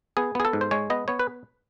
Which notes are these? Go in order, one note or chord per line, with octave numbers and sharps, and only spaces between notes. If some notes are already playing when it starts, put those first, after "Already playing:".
B3 G#4
B3 G#4
A4
G#2
C5
G#3 C#5
B3 D#5
B3 C#5
B4